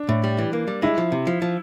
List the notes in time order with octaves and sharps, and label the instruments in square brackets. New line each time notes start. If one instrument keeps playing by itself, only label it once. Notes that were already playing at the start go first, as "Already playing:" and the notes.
Already playing: [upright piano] D4
[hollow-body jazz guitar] A2
G3
E3
A#3
G3
[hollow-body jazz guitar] G#3 [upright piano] E4
[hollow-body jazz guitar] F3
C3
F3
F3